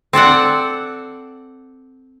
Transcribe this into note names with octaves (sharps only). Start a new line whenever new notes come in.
C4 A4 D5 F#5